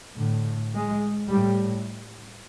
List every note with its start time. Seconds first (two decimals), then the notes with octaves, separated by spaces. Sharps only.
0.19 A2 D3
0.76 G#3
1.31 A2 G3